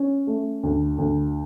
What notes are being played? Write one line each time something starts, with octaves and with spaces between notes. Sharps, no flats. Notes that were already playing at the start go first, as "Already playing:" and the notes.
Already playing: C#4
A3
D2
D2